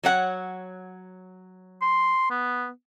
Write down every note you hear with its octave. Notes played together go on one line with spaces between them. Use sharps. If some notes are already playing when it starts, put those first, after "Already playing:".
F#3 C#5 F#5
C6
B3